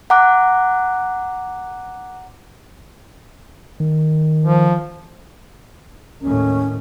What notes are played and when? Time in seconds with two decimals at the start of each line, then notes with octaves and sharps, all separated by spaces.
0.10 F#5 A#5 D6 F#6
3.80 D#3
4.44 F3
6.22 D#2 A2 C#4